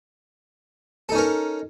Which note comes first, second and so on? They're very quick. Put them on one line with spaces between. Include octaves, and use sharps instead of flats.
A4 D#4 C#4 A#4